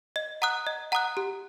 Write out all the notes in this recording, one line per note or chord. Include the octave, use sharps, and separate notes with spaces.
D#5
F#5 A#5 D#6 F#6
D#5
F#5 A#5 D#6 F#6
G4